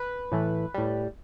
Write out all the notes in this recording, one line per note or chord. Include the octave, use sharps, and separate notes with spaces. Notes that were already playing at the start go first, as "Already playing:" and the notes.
Already playing: B4
A2 E3 A3
A2 G3